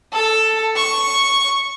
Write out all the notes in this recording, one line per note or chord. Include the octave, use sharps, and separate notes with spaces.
A4
C#6